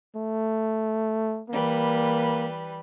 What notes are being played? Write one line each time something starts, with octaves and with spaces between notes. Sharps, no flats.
A3
E3 G3 A#3 B4